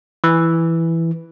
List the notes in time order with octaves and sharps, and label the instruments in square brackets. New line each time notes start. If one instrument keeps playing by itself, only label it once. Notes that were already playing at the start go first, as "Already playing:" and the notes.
[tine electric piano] E3